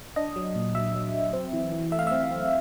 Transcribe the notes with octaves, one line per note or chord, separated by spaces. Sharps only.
D4 D#5
F#3
A#2
F#3 E5
F#3
F#3
C4
E3
E3
A3 E5
F5
C4 E5
C4